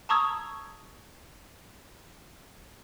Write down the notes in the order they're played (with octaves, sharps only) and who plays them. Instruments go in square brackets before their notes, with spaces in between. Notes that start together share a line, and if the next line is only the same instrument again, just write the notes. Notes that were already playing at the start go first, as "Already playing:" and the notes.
[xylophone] A5 A#5 C#6 D#6 E6 G#6